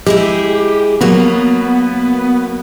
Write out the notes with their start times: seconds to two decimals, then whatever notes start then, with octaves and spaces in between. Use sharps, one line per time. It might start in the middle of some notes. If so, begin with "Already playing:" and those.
0.07 G#3 E4 G4 G#4
1.01 F#3 A#3 B3 F#4